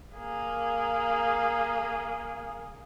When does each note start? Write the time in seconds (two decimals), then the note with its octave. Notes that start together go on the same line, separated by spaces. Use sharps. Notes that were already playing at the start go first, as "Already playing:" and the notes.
0.15 A#3 G#4